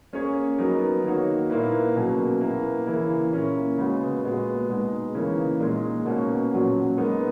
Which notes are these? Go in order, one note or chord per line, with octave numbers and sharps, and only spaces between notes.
A#3 C#4 G#4 C#5
F#3 B3 D#4 A#4
D#3 A#3 D#4 F#4 C#5
A#2 A#3 E4 B4
B2 F#3 A#3 C#4 G#4
A#3 E4 B4
C#3 E3 A#3 E4
A#2 A#3 C#4 E4 A#4
C#3 G#3 B3 F#4
A#2 G#3 B3 F#4
B2 G#3 D#4
C#3 E3 A#3 C#4
A#2 G#3 D#4
B2 A#3 C#4
A#2 F#3 C#4 F#4
G#3 B3 D#4 A#4